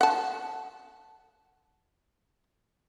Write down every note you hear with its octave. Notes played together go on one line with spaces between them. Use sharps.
F#5 A5